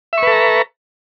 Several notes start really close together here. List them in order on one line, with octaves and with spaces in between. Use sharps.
E5 C#6 B4 A4 A#5